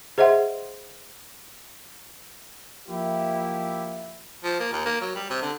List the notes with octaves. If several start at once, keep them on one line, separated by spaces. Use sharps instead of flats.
G#4 C5 D#5 E5 F#5 C6
F3 A#3 E4 G4
F3
A#3
D#2
A#3
F#3
G3
C3
D3